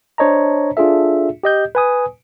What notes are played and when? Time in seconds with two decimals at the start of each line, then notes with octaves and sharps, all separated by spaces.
0.18 D4 C5 C#5 D#5 A5 A#5
0.77 D4 F4 G#4 A4 E5
1.43 G4 D#5 G6
1.75 B4 G#5 D#6